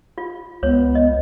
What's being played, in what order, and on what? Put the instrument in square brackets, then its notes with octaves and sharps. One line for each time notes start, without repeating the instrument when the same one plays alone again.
[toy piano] F4
[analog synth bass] C#2 [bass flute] B3 [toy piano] C#5
[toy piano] D#5